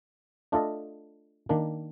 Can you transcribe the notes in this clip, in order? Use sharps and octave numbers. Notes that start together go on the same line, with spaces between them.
A3 D4 F4 A4 D#5
D#3 A#3 D4